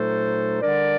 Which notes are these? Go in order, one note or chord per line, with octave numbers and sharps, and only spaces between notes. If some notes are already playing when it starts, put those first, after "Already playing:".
Already playing: A#2 F#3 A3 D#4 A4 C5
D3 G3 D4 A#4 D5